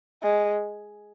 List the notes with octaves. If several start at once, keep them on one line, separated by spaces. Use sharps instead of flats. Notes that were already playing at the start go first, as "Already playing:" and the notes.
G#3